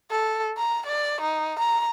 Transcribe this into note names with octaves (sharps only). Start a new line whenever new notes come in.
A4
A#5
D5
D#4
A#5